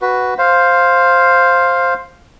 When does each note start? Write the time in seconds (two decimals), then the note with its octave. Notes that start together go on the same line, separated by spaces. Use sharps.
0.02 F#4 B4
0.38 C5 F5